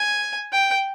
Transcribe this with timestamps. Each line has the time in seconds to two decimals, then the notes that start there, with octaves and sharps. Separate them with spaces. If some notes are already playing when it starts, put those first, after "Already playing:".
Already playing: G#5
0.53 G5